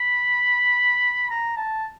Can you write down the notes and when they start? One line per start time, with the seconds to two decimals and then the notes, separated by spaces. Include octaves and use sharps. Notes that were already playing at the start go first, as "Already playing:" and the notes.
Already playing: B5
1.30 A#5
1.57 A5